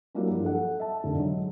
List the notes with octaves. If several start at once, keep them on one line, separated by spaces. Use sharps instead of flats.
F#3 G3 A#3 E4 F#4
G2 F3
A4 F#5
E5 A5
F1 D3 D#3
F#3 G#3